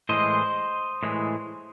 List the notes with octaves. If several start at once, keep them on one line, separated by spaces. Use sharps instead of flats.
A2 E3 G#3 C5 D#5
A2 E3 G#3